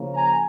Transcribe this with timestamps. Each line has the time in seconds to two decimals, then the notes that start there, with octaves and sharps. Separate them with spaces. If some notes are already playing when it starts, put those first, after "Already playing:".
Already playing: C#3 F3 A#3
0.14 G#5 A#5